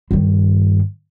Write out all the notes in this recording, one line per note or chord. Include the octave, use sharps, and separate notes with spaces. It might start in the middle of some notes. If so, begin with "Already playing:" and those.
G2 D#3